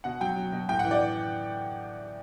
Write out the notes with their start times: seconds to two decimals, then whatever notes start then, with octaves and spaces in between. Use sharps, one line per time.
0.04 B2 F#5
0.21 F#3 G5
0.36 F#3
0.52 B2
0.69 A2 G5
0.79 F#5
0.85 E3
0.91 D5